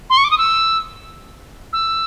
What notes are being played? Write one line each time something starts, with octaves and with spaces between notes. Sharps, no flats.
C6
C#6
D6
D#6
E6
E6